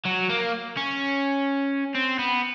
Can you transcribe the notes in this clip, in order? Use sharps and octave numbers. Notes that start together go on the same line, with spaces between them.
F#3
A#3
C#4
C4
B3